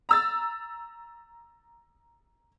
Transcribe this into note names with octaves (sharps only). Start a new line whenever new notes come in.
A#5 E6 A6